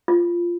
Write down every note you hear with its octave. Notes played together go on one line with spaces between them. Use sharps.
F4